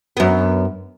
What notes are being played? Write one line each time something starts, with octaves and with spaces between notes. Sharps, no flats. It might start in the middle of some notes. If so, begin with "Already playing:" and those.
F#2 B3